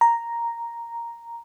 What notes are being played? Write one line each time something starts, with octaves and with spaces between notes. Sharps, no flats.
A#5